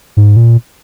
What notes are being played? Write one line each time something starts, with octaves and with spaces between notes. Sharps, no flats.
G#2
A#2